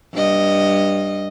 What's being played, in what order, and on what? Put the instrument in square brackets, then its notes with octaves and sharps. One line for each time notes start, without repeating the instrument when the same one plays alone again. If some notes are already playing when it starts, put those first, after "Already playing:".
[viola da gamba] G2 D#5